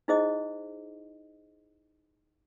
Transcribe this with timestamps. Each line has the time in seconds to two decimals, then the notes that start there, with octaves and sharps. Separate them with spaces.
0.08 D#4 E4 G#4 C5 D#5 D#6